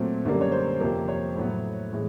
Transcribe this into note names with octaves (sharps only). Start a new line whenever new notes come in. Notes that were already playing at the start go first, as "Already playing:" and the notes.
Already playing: A#2 F#3 A3 C4
F#2 D3 G3 A#3
C#5
C5
F2 C3 F3 A#3
C#5
A2 F#3 B3
A2 E3 G#3